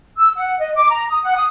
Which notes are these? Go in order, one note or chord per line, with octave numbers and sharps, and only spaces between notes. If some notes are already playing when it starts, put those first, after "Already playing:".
E6
F#5
D#5
D6
A#5
D#6
F#5
D#6